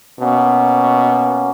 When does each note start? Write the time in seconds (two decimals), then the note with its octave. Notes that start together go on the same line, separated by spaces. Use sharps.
0.20 B2 A#3 B3 C#4